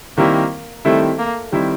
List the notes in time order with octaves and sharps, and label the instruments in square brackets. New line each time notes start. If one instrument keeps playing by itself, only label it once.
[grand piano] D#3 G3 C4 E4 [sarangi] A#3
[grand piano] D#3 G3 C4 E4 [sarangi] A3
[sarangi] A#3
[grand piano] D#3 G3 C4 E4